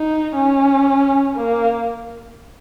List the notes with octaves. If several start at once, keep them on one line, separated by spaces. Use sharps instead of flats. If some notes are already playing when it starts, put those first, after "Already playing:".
Already playing: D#4
C#4
A#3